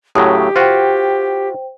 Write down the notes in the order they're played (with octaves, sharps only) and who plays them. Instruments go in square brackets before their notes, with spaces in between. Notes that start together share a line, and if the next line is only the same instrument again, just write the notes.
[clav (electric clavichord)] A2 C#3 F#3 [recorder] G4 [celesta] D#6
[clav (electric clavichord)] F4 F#4 [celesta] C5 G5